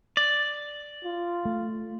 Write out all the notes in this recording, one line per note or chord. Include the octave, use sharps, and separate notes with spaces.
D5
F4
A3